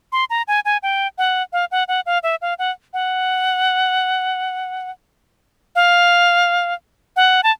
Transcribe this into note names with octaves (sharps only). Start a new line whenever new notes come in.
C6
A#5
G#5
G#5
G5
F#5
F5
F#5
F#5
F5
E5
F5
F#5
F#5
F5
F#5
A5